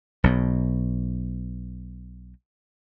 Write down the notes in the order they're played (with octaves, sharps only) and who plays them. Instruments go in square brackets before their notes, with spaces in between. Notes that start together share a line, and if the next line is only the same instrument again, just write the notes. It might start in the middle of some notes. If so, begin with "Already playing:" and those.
[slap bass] B1 B2